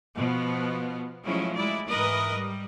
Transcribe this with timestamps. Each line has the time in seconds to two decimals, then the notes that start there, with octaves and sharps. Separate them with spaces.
0.17 B2 F3 B3
1.25 F3 F#3 G#3 A3 C#4 E4
1.55 G#3 E4 D5
1.89 G#2 E3 A#4 B4 D#5
2.35 G3